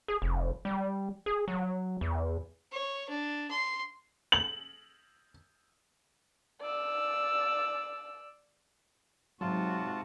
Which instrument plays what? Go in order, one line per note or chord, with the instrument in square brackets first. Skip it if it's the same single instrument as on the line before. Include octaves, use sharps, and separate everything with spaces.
[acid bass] G#4
F1
G3
G#4
F#3
E2
[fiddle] C#5
D4
C6
[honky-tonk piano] F#7
[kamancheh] D5 E6
[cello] G#2 F#4 [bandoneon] C3 F4 A5 [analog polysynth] F#3